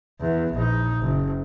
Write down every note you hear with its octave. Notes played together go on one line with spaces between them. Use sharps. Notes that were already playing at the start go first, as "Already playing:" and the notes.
E2
A#1 D#4
F#1